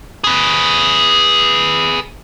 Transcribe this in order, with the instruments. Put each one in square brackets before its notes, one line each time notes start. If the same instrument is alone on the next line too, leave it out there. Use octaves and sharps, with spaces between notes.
[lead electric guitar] G#4 B4